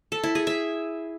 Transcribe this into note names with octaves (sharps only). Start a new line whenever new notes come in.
A4
E4
G#4
E5